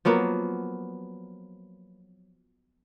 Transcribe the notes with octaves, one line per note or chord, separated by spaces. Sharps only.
F3 F#3 A#3 B3